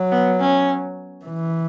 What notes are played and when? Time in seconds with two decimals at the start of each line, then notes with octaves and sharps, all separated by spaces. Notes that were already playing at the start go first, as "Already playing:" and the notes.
Already playing: F#3
0.12 B3
0.40 C#4
1.25 E3